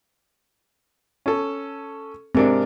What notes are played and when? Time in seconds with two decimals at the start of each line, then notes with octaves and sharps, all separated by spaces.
1.26 C#4 A4
2.35 G#2 C3 C4 D4 A#4